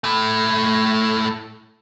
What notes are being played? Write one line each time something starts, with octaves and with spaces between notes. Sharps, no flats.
A2 A3